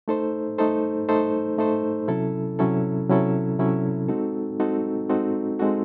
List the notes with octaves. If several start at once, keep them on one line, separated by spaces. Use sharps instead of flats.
A3 D#4 A4 C5
A3 D#4 A4 C5
A3 D#4 A4 C5
A3 D#4 A4 C5
C3 F#3 C#4 E4 A4
C3 F#3 C#4 E4 A4
C3 F#3 C#4 E4 A4
C3 F#3 C#4 E4 A4
G#3 C4 D#4 F#4 A4
G#3 C4 D#4 F#4 A4
G#3 C4 D#4 F#4 A4
G#3 C4 D#4 F#4 A4